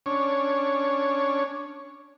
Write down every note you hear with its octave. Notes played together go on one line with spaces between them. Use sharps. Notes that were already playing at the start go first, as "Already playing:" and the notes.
C#4 D4 C#5